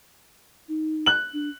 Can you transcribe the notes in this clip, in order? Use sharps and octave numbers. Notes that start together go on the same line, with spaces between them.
D#4
F#6 F#7
D4